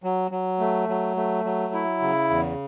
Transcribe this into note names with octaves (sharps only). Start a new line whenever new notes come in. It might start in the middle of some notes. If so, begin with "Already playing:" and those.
F#3
F#3
A3
F#3
A3
F#3
E4
C#3
E2